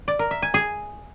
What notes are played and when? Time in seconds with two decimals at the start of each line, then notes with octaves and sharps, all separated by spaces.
0.08 D5
0.19 A#4
0.31 E5
0.42 G#5
0.54 G#4